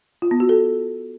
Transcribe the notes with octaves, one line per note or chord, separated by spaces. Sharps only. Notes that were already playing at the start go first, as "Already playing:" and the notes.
F4
B3
F#4
A4